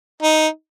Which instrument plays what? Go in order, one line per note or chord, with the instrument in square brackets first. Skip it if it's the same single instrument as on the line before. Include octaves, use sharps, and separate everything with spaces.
[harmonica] D#4